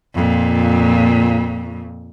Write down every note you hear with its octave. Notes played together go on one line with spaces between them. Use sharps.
F2 A#2